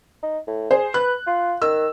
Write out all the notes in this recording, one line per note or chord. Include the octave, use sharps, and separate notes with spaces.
D#4
A2
G#4 C5
B4 F#6
F4
D#3 E6